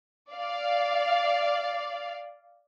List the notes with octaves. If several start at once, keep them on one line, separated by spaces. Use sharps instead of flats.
D5 F5